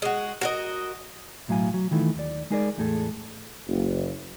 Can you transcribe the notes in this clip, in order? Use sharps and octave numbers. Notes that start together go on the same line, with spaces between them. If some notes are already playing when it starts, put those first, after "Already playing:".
G#3 F#4
F#4 A#4 D#5
B1 A2 F#3 F5 G#5
F#3
D#3 E3 A3 F4
D#2 D5
G#3 D#4 G#4 A#4 B4 D5
E2 A2 A3 G#4 A4
F#1